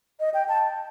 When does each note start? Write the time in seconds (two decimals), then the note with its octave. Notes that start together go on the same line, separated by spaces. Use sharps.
0.20 D#5
0.34 G5
0.48 A5